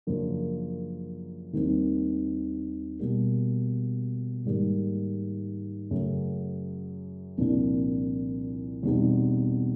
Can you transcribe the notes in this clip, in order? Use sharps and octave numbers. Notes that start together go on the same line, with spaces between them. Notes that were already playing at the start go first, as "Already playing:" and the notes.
F#2 C#3 F3 A#3 D4
D#2 D#3 G3 C4
B2 G3 A#3
G#2 D#3 G3 A#3
F#2 C#3 F#3 A3
C2 A#2 F3 A#3 D4
E2 B2 G3 C4 D#4